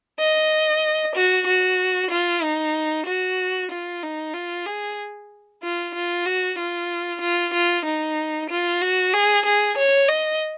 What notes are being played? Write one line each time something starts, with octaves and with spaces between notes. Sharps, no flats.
D#5
F#4
F#4
F4
D#4
F#4
F4
D#4
F4
G#4
F4
F4
F#4
F4
F4
F4
D#4
F4
F#4
G#4
G#4
C#5
D#5